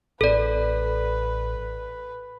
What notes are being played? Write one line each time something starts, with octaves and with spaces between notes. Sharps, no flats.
A1 C4 A4 B4 D5